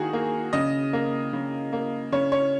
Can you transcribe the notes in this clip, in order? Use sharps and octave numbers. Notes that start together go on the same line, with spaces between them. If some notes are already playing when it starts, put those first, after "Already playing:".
Already playing: D#3 A#3 F#4 G#4
A#3
C#3 D#5
A#3
C#3
A#3
C#3 C#5
C#5